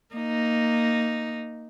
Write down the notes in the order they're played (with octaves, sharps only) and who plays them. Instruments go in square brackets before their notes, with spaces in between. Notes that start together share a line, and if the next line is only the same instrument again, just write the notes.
[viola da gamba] A#3 D#4